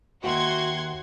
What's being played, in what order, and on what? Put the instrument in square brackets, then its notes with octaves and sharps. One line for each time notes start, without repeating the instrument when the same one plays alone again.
[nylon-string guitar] D#2 E5 G5 [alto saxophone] F#4 [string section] F#5 C6 G#6